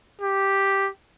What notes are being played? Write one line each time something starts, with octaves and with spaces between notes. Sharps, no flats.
G4